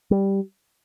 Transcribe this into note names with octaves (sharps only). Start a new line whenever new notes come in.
G3